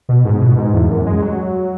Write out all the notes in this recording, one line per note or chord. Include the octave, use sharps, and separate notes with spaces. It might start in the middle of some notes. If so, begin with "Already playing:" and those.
B2
G#2
B2
G#2
E2
F#2
G#3
F#3